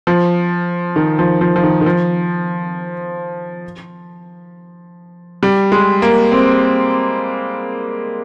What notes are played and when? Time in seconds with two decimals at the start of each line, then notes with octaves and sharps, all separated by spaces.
0.07 F3
0.96 D#3
1.19 F3
1.41 F3
1.56 F3
1.63 D#3
1.81 D#3
1.86 F3
5.43 G3
5.72 G#3
6.02 A#3
6.32 C4